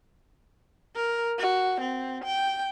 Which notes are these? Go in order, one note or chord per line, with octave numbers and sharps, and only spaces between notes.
A#4
F#4
C4
G5